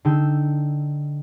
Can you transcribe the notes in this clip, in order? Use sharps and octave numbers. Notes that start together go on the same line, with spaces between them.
D3 D#4 G5 E6